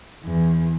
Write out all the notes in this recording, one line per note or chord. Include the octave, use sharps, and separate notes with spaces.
E2